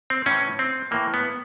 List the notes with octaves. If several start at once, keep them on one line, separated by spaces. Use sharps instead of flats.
C4
A2 E3 C#4
C4
A2 E3 A#3
B3